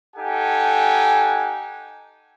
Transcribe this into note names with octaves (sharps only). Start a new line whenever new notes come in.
D#4 G4 A4 F#5 G#5